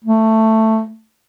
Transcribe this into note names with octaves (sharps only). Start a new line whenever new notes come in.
A3